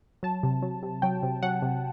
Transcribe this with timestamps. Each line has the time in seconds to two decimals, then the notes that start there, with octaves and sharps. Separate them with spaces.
0.23 F#3 A5
0.43 C3
0.62 F#3
0.83 C3
1.02 F#3 G5
1.23 C3
1.43 F#3 F#5
1.62 C3